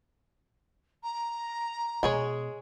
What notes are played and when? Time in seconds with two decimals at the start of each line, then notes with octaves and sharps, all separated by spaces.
1.03 A#5
2.03 B2 G#3 G#4 C#5